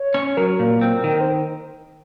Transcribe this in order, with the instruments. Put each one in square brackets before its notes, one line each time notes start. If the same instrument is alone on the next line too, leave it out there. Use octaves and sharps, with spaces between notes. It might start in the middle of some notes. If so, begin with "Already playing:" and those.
Already playing: [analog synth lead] C#5
[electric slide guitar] C#4
[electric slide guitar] F#3 [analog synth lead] A#4
[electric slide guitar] A#2
C4
D#3
[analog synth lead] C5